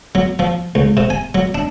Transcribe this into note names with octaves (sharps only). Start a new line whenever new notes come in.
F#3
F3
C#2
C3
G#5
F#3
D4